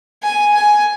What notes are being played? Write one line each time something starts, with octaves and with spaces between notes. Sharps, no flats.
G#5
G#5